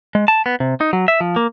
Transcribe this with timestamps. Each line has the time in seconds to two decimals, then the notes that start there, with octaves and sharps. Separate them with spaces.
0.15 G#3
0.28 A5
0.46 B3
0.60 C3
0.81 D#4
0.93 F#3
1.08 E5
1.21 F3
1.36 A#3